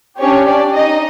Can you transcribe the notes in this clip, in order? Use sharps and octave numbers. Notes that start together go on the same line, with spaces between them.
C#4 D4 G4 C#5
D4 D5
D#4 D#5